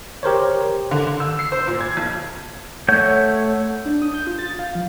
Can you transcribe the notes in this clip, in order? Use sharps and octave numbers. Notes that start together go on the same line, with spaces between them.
G4 A#4 C5 C#5
D3
D3
E6
C7
C5
A#2
G#6
B1
A3 C#5 F#5 G6
D4
D#6
G6
F4
A6
F5
F3